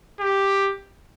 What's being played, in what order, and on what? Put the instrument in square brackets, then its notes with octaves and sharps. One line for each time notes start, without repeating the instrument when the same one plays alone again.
[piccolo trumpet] G4